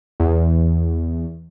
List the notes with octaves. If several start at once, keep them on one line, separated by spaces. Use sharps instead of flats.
E2